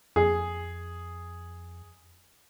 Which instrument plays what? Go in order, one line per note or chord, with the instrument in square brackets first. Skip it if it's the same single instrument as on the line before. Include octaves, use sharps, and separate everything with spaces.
[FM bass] F2 [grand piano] G#4